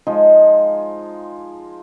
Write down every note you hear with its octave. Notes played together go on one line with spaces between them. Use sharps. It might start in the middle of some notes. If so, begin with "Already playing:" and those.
F3 G#3 D#4